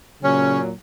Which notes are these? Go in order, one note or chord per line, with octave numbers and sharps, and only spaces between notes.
A#2 C#3 F#3 C#4